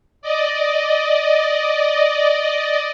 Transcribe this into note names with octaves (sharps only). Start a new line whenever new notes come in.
D5 D#5